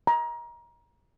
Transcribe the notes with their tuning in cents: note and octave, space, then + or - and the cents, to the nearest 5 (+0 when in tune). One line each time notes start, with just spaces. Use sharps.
A#5 +25